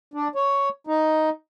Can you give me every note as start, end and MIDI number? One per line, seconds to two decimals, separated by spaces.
0.14 0.28 62
0.35 0.69 73
0.87 1.29 63